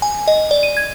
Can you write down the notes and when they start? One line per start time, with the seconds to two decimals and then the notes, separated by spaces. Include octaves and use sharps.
0.02 G#5
0.28 D#5
0.51 D5
0.63 D#7
0.77 G#6